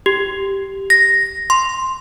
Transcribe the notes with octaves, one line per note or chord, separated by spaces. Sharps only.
G4
A#6
C6